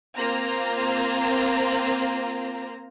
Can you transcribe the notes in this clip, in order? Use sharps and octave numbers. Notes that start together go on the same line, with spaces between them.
A#3 C4 F4 A#5